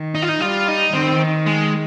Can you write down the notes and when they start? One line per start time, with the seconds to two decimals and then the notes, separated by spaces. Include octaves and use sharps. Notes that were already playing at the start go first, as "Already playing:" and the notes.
Already playing: D#3
0.15 D#4
0.22 F4
0.28 D#4
0.40 G3 F4
0.68 D#4
0.94 D#3 C4
1.47 G#3